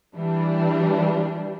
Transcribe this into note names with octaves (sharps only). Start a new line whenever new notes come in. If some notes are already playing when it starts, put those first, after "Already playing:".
E3 G3 D4